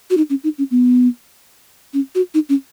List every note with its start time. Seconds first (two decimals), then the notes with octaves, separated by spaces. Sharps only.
0.10 F#4
0.17 D#4
0.30 C#4
0.44 D#4
0.58 C#4
0.71 B3
1.94 C#4
2.15 F#4
2.34 D#4
2.49 C#4